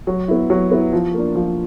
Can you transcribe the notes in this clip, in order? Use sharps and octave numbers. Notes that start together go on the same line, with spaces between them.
F#3
B3 E4
F#3
B3 E4
F3
A#3 D4
F3